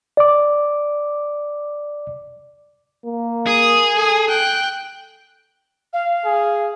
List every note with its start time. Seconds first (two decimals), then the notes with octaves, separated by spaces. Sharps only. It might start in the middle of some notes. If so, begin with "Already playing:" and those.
0.17 D5 D6
3.05 A#3
3.47 G#4 D#6
3.96 A4 G#5 D#6
4.29 G5 F#6
5.93 F5
6.25 G#4